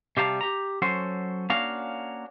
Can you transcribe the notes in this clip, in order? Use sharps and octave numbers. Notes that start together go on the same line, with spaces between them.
C3 G3 G4 F5 A5 A#5
G4 A#5
F#3 C#4 F#4 A4 C5
A#3 C#4 D4 F#4 F5